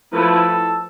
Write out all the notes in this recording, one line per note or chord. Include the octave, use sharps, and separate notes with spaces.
F3 A3 E4 A4 B4